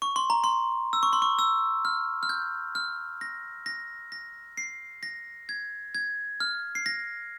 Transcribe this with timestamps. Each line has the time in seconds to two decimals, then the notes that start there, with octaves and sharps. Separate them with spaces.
0.02 C#6
0.16 C6
0.30 A#5
0.44 C6
0.93 E6
1.03 C#6
1.13 C6
1.22 C#6
1.39 E6
1.85 F6
2.23 F6
2.29 G6
2.75 F6
3.21 A#6
3.66 A#6
4.12 A#6
4.57 C7
5.03 A#6
5.49 G#6
5.95 G#6
6.40 F6
6.75 C7
6.86 A#6